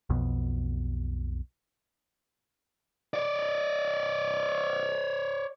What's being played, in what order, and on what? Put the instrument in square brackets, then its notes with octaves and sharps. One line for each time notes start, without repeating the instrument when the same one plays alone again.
[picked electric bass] B1 F2 B2
[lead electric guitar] C#5 D5